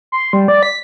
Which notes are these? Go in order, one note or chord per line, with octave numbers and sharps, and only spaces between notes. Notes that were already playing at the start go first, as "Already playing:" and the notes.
C6
G3
D5
B6